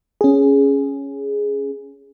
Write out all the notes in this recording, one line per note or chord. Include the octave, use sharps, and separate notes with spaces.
C#4 G#4